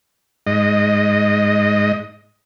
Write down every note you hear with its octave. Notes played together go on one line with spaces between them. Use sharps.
G#2 D#5